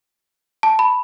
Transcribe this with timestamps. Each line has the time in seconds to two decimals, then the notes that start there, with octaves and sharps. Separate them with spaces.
0.63 A5
0.79 B5